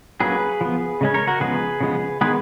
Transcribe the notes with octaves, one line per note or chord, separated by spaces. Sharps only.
F#3 A#3 C#4 G#4 B4
F3 B3
C#3 G#3 C#4
A#4 C#5
F#4 A#4
C#3 F3 G#3 B3 G#4 B4
C#3 F3 G#3 B3
D#3 G#3 B3 G#4 B4